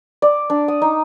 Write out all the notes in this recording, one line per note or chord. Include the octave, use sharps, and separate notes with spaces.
D5
D4
D#6
D#4